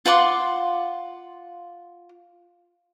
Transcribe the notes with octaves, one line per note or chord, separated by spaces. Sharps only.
F4 F#5 C6 D6